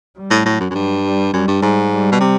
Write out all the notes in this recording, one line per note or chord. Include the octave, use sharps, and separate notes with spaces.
G3
A2
A2 F#3
F#2
F#2
G2
G3
F#2 G3
G2
G#2
G3
B2
C3